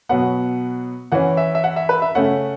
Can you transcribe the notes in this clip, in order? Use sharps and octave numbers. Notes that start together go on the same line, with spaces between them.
B2 F#3 B3 F#5
E3 C#4 F#5
E5
E5
F#5
E5
B4
E5
C#3 A3 C#4 F#5